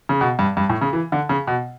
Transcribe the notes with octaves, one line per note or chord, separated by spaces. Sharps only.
C#3
B2
G2
G2
A2
C#3
E3
D3
C#3
B2